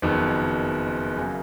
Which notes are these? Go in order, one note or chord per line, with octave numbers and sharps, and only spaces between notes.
F#1 F2 D#3 F#3 B3
F#2 C#3 F#3 A#3